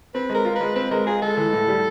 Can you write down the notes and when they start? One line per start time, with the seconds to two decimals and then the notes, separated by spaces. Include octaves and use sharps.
0.14 C4 B4
0.30 G#3 A#4
0.45 F4
0.55 B4
0.61 G#3
0.75 C4 B4
0.91 G#3 A#4
1.07 F4 G#4
1.22 G#3 A4
1.37 E3
1.53 A2
1.68 G3